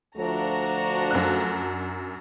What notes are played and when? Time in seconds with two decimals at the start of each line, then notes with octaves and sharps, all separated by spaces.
0.17 D2 F3 A3 D4 F#4 A#5
1.11 F#2 F#6